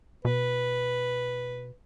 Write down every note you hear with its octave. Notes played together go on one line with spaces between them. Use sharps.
B2 B4